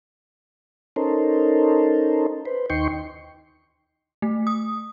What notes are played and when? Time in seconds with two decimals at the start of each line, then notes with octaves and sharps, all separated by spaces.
0.96 C#4 D#4 A4 A#4 C5
2.45 B4 C5
2.70 D#2 D#4 G5 C6 C#6
4.22 A3
4.47 D#6